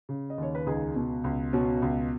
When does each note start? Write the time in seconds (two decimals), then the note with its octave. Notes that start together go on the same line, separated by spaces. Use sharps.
0.09 C#3
0.30 D#5
0.38 D#2 C#5
0.55 B4
0.66 C#2 D#4 G#4
0.96 B2
1.24 C#2
1.53 B2 C#4 F#4
1.82 C#2